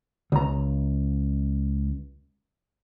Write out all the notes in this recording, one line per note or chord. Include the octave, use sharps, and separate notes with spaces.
C#2 A#5